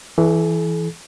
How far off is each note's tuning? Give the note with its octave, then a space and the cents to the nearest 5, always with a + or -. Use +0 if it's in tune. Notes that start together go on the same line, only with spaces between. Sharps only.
E3 +0 A4 -45